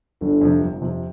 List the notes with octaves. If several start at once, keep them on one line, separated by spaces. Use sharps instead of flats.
G1 D3
F2 C3
G1
F2 C3